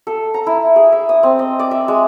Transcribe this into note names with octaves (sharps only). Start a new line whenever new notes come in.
A4
A#5
E4
G#4
E5
D#6
C4
D#5
D5
E5
G#3